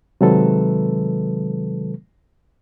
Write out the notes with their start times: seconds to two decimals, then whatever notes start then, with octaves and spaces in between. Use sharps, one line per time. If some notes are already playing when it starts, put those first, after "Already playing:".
0.21 C3 D#3 F#3 G#3 A4 B4